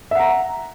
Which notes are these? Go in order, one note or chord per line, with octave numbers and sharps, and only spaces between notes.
E5 F#5 A#5